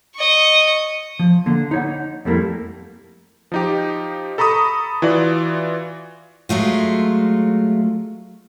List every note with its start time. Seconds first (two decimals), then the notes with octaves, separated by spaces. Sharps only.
0.16 D#5 C#6
1.19 F3
1.46 D3 A#3
1.71 D#4 C#5 F#5
2.25 F2 G3 A3 A#3 E4
3.52 F3 D#4 G4
4.38 A4 A#5 B5 C#6 D#6
5.02 E3 F4 F#4 D5
6.49 F#3 G#3 A3 F4